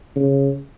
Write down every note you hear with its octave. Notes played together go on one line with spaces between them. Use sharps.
C#3